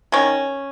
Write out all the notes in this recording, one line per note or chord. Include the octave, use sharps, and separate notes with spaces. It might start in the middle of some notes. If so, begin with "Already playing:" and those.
D#3 C#4